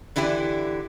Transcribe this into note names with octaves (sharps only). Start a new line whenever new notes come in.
D3 E3 E4 G4